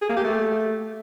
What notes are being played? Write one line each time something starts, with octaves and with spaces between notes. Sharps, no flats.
G#4
A#3
G4
A3